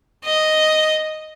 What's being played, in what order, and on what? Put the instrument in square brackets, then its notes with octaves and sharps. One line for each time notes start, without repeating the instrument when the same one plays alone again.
[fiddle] D#5